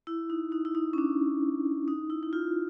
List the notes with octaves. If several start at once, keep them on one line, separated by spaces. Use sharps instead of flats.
E4
D#4
D#4
E4
D#4
C#4
D4
D#4
E4
E4
F4